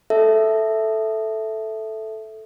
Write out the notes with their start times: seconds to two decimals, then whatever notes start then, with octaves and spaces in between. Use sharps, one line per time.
0.10 A4 E5